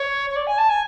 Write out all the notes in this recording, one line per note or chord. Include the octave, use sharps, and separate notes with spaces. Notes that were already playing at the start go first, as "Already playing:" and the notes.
Already playing: C#5
C#5
D5
G#5
A5
G#5